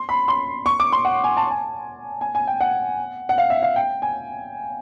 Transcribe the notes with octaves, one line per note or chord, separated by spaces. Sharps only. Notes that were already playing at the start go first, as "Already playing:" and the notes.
Already playing: C6
B5
C6
C#6
D6
C6
F#5
G#5
A5
G#5
G#5
G#5
G5
F#5
F#5
F5
E5
F5
G5
G#5